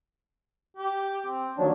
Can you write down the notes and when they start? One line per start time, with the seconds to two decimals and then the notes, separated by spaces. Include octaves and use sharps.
0.77 G4
1.26 C4
1.58 D#2 F3 F#3 D4